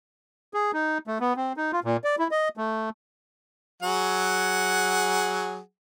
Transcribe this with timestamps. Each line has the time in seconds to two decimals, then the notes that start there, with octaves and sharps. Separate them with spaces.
0.54 G#4
0.73 D#4
1.07 A3
1.20 B3
1.36 C4
1.57 D#4
1.73 F4
1.84 A#2
2.04 D5
2.19 E4
2.31 D#5
2.57 A3
3.83 F#3 G#4 F#5